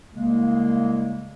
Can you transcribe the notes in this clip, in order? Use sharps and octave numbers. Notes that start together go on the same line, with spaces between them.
C2 C#3 G#3 A#3